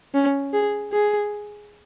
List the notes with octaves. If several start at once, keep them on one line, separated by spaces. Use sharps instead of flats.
C#4
G#4
G#4